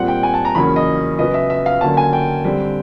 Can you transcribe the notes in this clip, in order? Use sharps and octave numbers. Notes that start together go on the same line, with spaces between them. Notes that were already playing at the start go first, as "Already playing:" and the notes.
Already playing: A#2 G3 C4 F#5
G5
G#5
A5
A#5
E2 C#3 F#3 A#3 C#4 B5
D#5
C#3 F#3 B3 D#5
E5
E5
F5
D3 F#3 A#3 C#4 A5
G#5
G5
D3 G3 C4